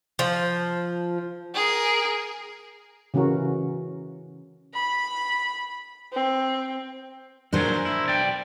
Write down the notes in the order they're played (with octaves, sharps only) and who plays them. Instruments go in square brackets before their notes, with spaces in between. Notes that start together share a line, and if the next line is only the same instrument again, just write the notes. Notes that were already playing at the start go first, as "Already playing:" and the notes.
[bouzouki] F3
[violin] G#4 A#4
[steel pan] C#3 E3 C#4 F#4 A#4
[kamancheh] B5
C4
[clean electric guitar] A#2 F#3 G#4 [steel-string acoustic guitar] D4 A#4 C5
[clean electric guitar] E4
B1 D5 G5